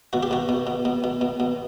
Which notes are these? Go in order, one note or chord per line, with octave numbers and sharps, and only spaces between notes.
B2 F#4
G4
B2 F#4
B2
B2
B2
B2
B2
B2